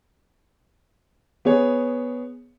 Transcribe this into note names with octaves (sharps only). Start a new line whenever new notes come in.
B3 G#4 C#5